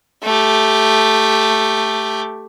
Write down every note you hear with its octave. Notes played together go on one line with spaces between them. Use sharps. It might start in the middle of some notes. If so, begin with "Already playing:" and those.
A3 G4